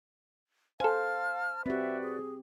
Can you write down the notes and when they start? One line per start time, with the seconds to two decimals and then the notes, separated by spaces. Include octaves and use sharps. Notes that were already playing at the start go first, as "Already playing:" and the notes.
0.80 A4 C5 F5 G#5 A5 F6
1.66 C4 F#4 G4 B4 D5 E5
2.02 G#4